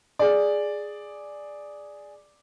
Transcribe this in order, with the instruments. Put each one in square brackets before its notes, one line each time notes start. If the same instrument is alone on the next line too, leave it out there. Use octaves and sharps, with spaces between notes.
[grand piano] G#4 D5